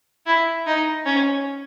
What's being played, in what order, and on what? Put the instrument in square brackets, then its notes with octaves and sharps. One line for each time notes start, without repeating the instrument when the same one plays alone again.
[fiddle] E4
D#4
C#4